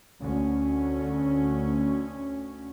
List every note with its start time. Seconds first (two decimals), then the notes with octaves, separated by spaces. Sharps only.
0.19 D2 C#4